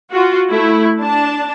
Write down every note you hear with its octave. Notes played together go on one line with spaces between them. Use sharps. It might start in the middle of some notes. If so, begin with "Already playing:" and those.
F4 F#4
A3 E4
D4 A5